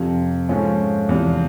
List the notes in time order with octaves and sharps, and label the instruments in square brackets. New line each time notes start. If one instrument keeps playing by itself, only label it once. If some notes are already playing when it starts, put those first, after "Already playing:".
Already playing: [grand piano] F2 C3 F3
G#2 F3 A3 C#4 F4
E2 C3 F3